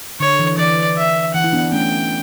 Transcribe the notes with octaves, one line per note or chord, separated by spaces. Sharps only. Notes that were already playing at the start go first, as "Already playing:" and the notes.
D3 C#5
E3
E3 D5
E5
E3 F#5
E4
B3 D4
A3 C#4 G5